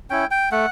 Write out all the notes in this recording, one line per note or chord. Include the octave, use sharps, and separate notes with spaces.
C#4 E4 G5
G5
A3 F#5